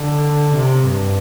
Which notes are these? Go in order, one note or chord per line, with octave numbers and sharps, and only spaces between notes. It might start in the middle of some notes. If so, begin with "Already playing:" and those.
Already playing: D3
C3
G2